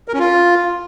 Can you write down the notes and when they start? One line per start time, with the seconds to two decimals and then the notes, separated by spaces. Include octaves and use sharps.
0.08 A#4
0.14 C#4
0.19 F4